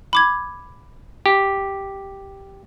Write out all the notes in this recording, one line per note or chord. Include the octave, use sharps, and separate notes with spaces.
B5 D6 G#6
G4